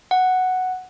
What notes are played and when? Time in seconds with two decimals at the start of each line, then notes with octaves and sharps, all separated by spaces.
0.11 F#5